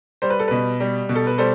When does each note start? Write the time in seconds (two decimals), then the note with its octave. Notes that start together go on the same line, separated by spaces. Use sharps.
0.22 G3 C5
0.30 B4
0.39 A4
0.48 B2 B4
0.80 G3
1.09 B2
1.16 A4
1.27 B4
1.38 G3 A4 C5